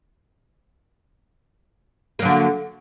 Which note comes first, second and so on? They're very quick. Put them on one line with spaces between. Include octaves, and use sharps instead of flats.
A#3 F#3 D3